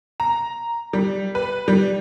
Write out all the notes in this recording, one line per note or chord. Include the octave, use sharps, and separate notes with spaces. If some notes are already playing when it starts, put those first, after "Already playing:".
A#5
G3
B4
G3